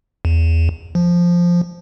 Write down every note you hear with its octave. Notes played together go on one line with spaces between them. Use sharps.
E2
F3